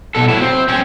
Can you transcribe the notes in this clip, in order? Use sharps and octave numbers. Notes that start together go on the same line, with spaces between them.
B2 A4
F#3 E4
C4
C4 C#4